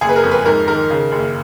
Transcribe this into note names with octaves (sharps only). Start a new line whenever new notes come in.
F#1 G#4
B4
A#4
F2
B4
G#2 A#4
D#3 A#4
C#3
F#1